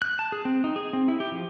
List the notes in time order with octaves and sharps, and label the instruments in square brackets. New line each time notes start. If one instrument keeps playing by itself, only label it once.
[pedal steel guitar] F#6
A5
G#4
C4
D#4
G#4
C4
E4
G4
F3